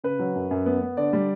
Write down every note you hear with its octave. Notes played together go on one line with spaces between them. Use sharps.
C#3 B4
F#3
F#2
F#2
B3
B3
D3 D5
G3